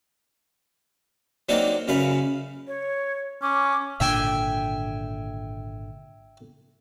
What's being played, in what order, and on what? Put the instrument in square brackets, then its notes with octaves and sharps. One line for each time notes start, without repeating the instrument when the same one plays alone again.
[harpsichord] F#3 A#3 C4 D4 D#4
F#2 C#3 B4 F5
[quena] C#5
[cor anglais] C#4 [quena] D6
[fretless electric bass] G#1 A#2 D3 [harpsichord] E5 G5 G#5